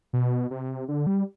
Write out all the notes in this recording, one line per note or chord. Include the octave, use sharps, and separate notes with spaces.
B2
C3
D3
G3